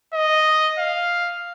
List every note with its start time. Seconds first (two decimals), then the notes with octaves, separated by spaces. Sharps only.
0.14 D#5
0.79 F5